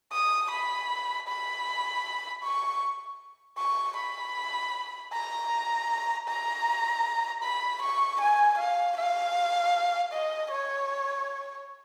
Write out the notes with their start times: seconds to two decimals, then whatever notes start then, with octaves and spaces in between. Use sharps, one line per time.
0.13 D#6
0.51 B5
1.28 B5
2.43 C#6
3.59 C#6
3.97 B5
5.13 A#5
6.29 A#5
7.43 B5
7.83 C#6
8.21 G#5
8.59 F5
8.97 F5
10.12 D#5
10.51 C#5